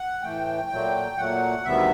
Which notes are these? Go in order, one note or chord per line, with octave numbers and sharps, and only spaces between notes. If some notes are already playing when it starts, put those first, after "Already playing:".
Already playing: F#5
A2 E3 A3 G5
A#2 F#3 A3
A#2 F#3 A3 F#5
D2 C3 D#3 G3 B3 E5